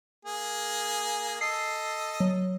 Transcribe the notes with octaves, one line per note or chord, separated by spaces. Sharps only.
A#3 G#4
A4 D#5 C7
F#3